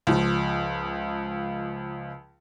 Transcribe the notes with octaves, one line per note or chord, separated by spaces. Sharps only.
C#2 F3